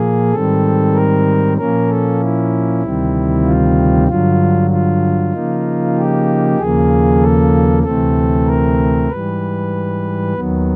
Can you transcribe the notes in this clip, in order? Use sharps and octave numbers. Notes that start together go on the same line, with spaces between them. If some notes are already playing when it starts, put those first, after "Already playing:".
Already playing: A#2 F3 A#3 G#4
G#2 D#3 G3 C4 A4
A#4
A#2 F3 A#3 C#4 A#4
A4
E4
D2 C3 D#3 G3 C4
F4
G2 D3 F#3 F4
F4
C#3 F3 A#3 D#4
G4
D#2 C#3 F3 A#3 G#4
A4
D2 C3 E3 A3 C4 A4
A#4
G#2 E3 G3 B4
D#2 D#3 F#3 B3